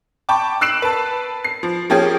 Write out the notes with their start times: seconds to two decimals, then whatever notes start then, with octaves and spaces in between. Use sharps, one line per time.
0.29 G5 A5 B5 C#6 D6
0.61 E6 F#6 C7 D7 E7 F#7
0.82 B4 A5
1.44 C7
1.63 F3
1.90 F3 A#3 C#4 G4 G#4